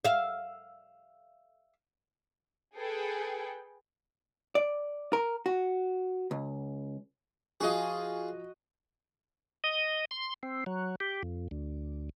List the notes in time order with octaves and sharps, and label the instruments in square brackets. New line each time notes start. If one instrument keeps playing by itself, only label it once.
[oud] E5 F5
[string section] G#4 A4 B4 G5
[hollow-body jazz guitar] D5
A#4
F#4
C#2
[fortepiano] F3 [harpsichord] F4 G#4 [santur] F#4 D#5
[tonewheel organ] D#5
C6
C4
F#3
G4
F2
D2